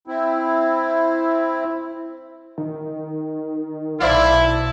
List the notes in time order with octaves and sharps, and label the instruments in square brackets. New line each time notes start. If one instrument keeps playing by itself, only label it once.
[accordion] C4 E4
[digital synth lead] D#3
[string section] B1 A5 [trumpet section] E4 [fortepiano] C5 D5 F5